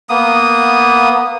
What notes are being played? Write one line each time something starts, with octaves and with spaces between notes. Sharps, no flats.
A#3 B3 D#6